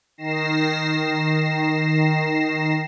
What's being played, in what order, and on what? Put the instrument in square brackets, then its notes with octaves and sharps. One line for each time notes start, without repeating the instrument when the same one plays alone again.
[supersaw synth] D#3 A#6 C7 E7